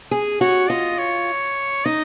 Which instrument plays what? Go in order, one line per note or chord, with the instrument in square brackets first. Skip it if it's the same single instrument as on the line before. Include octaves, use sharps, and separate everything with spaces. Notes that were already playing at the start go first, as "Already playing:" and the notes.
[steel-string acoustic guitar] G#4
[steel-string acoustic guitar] F#4 [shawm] C#5
[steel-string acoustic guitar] F4 [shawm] D#5
[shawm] C#5
[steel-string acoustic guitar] D#4 [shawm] D#5